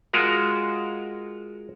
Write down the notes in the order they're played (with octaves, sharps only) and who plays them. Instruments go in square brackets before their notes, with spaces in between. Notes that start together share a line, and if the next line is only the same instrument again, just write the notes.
[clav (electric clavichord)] G#3 F4 F#4 A#4